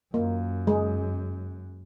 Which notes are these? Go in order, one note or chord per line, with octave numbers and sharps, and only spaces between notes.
F#2 A#3
G#3